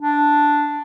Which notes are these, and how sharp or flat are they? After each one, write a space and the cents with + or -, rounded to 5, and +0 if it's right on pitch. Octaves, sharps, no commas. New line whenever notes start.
D4 +0